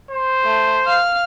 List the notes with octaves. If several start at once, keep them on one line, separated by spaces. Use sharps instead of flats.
C5
A3
F5 F6